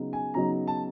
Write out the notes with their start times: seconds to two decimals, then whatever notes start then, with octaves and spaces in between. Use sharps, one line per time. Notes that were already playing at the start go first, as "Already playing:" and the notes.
Already playing: C#3 F#3 B3 D#4
0.13 G#5
0.34 C#3 F#3 B3 D#4 A#5
0.67 A5